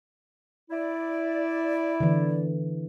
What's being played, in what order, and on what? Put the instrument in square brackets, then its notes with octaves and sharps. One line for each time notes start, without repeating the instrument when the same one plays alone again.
[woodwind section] E4 D5
[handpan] D3 E3